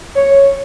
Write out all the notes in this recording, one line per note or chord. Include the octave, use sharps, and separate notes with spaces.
C#5